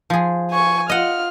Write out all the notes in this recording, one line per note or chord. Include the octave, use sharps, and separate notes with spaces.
F3 G#4
G#5 C#6
F4 D#5 F#5 F6